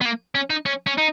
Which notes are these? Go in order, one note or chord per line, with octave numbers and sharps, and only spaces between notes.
B3
A#3
C#4
D#4
C#4
C#4
D#4